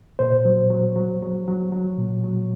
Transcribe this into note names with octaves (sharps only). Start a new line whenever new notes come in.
A#2 C5
F#3
F#3
F#3
F#3
F#3
F#3
A#2
F#3